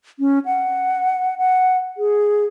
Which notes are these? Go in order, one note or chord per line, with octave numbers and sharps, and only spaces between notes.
C#4
F#5
F#5
G#4